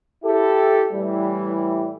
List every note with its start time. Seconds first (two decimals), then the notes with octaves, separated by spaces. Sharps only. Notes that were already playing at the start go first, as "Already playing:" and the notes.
0.24 E4 G4 A4
0.92 A2 E3 G3